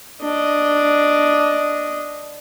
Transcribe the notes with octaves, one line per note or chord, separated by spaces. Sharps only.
D4 D#5